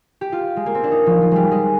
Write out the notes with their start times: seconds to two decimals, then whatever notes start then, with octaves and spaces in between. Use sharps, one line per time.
0.21 G4
0.32 F4
0.57 G#3
0.66 A#3
0.75 C4
0.84 D4
0.92 D#4
1.06 F3
1.22 F3
1.31 G3 G#3
1.51 G#3